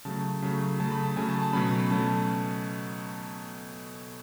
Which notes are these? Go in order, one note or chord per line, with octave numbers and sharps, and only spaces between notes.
C#3 F#3 A3 A5
C#3 F#3 A3
C#3 F#3 A3 A5
B5
A5
C#3 F#3 A3 G#5
A5
A5
B2 F#3 A3 C#4 B5
B2 F#3 A3 C#4 A5